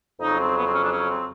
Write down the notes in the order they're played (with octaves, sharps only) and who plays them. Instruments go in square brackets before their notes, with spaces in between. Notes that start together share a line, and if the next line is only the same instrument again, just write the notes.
[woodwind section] F2 C#3 F#3 D#4
C4
B3
C4
C#4
D4
C#4
C4